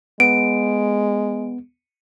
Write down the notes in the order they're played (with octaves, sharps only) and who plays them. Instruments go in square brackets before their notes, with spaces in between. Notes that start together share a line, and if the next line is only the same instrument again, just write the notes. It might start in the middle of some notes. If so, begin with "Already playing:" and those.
[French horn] G#3 [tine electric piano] B3 [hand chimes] D7